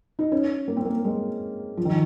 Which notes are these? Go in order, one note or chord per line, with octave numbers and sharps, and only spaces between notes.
D#4
C#4
A#3
C4
A#3
G#3
F3
D#3